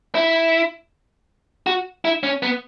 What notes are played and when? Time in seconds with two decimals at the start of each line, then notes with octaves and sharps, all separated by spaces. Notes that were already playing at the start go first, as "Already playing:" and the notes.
0.15 E4
1.67 F#4
2.05 E4
2.23 C#4
2.43 B3